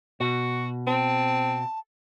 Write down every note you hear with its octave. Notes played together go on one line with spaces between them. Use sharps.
B2 F#4
C4 A5